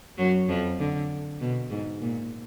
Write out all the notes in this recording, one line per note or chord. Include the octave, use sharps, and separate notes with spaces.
F#2 F#3
F2 F3
D3
B2
G#2
A#2